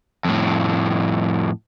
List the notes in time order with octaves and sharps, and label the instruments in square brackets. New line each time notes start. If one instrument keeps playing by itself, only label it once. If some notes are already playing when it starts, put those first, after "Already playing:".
[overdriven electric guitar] F2 A2